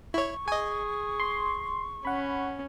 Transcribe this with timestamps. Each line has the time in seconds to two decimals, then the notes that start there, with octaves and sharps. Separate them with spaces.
0.14 E4 C#5 C#6
0.48 G#4 D#5 G#5
1.20 C6
2.05 C#4 F#5 B5